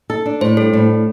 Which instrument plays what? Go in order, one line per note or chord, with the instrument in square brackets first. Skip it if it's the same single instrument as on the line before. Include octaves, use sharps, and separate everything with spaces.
[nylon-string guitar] A4
D4
[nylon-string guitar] A2 [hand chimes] C5
[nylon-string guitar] G3 [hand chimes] A4
[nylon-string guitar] A2